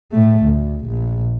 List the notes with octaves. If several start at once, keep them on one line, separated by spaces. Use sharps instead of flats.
A2 A3
D2
A#1